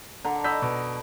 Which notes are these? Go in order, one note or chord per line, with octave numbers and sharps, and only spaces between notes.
D3 A#5
D#5 B5 E6 G6 B6
B2